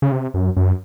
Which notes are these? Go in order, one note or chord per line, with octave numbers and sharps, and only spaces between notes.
C#3
C3
F#2
F#2